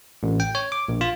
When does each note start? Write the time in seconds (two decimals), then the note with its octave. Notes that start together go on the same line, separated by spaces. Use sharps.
0.23 A1
0.40 G5
0.55 C#5
0.72 D6
0.88 A#1
1.01 F4